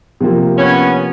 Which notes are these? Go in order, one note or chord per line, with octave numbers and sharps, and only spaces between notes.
C3 F3 A#3
B3 C#4